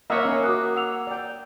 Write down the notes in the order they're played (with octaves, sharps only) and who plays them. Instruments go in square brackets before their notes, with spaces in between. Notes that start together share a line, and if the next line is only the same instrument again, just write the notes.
[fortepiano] A#3 C#5 [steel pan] D#5 E5 F#5
[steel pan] C#4
[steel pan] F#4 A#4 [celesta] D6 D#6 F#6
[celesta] F#5 E6 F7
[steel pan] D5 G5